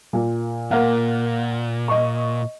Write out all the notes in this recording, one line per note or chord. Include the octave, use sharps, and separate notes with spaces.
A#2
A#2 A#3 F5 F#5
D#5 C#6